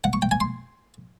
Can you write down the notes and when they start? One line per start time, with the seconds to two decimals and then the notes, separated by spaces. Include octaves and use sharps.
0.04 F#5
0.13 C#6
0.22 G5
0.31 G#5
0.40 C6